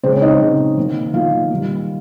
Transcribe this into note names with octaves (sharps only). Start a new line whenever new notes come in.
C#3 G#3 C4 C5
C#5
D#4 D#5
C#3 G#3 C4
D#3 A#3
D#3 A#3 F4 F5
D#3 G3 A#3